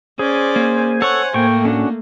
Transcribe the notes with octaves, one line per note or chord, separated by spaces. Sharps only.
C#4 G#4 C5 D5 G#5
A#3
A4 C#5 F#5 C#6
A2 A3 A#3 G5 C#6
C#4 D4 F#4